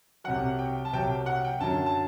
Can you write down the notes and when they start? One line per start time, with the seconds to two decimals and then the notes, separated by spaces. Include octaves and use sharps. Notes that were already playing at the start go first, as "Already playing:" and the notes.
0.24 C2 C3 F#3 F#5
0.59 G5
0.85 A5
0.93 C2 C3 F#3 G5
1.26 F#5
1.44 G5
1.61 F#2 D3 F#3 A5
1.86 A5